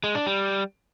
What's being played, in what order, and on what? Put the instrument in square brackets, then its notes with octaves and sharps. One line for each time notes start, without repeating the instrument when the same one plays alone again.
[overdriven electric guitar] G#3
D4
G3